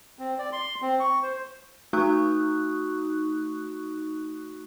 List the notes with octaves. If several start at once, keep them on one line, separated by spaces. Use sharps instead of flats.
C4
D5
C6
C4
C#6
C5
A3 D#4 F#4 C#6 D#6 F#6